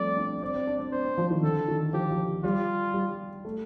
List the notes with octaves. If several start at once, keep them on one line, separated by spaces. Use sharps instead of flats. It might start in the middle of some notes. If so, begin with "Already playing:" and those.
Already playing: F3 G3 A3 C4 D5
D4
C4 D5
C4
D4
C4
D4 C5
C4
F3
D#3
D3 A4
D#3
F3 G4
F3
G3 F4
G3
A3